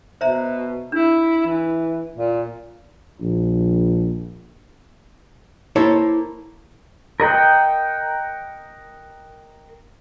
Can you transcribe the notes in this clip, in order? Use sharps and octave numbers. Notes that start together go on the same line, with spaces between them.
B2 C5 E5 A#5
D4 E4
E3
A#2
A#1
A#3 E4 A4 C5 C#5
A#4 D#5 F#5 G5